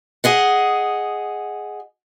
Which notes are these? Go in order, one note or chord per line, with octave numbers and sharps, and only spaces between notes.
G#4 D#5 F#5